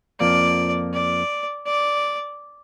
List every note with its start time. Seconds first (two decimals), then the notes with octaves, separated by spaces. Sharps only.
0.20 F2 F3 A#3 D5
0.93 D5
1.66 D5